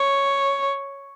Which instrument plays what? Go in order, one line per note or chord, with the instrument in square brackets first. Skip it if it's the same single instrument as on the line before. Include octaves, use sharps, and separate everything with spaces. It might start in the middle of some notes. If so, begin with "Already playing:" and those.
Already playing: [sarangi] C#5